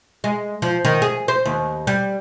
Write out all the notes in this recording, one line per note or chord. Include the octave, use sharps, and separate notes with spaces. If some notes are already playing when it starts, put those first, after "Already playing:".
G#3
F3
D#3
G#4
C5
D#2
G3